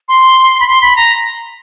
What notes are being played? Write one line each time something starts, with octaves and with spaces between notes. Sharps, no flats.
C6
B5
C6
B5
A#5